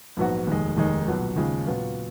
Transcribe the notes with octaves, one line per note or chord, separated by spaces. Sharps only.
A#1 G#2 F#3 B3 F#4
F1 D#2 D#3 G#3
F1 D#2 D#3 G#3 D#4
B1 A#2 F#3 B3
D#2 C#3 F3 G#3
A#2 F#3 B3 F4